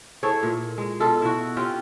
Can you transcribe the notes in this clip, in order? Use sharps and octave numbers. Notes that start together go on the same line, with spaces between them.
E4 G#4 A4 C#5
A#2
G#3
B2 F4 A4
E4 F#4
C4 C#4 F4 G4